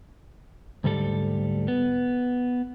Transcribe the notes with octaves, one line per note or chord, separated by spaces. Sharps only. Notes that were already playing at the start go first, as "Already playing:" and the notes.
D2 G#2 G3 A4
B3